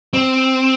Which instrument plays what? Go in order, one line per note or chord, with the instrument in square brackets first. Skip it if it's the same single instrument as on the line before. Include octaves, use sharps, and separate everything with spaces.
[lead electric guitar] C4